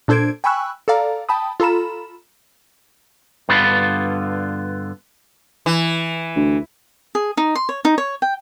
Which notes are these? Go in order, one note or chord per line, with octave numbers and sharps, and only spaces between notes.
A#2 D4 A4 C5 G#6 D7
G5 G#5 B5 C#6 E6 F#6
A4 D5 F5 A#5
G5 A5 B5 D#6
F4 A4 A#5 B5 E7
G2 D3 B3 F4 B5
E3
D2
G#4
D#4
C6
C#5
D#4
C#5
G5